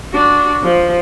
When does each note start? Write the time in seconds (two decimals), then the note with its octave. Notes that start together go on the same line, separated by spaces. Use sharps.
0.12 D4 F#4
0.63 F3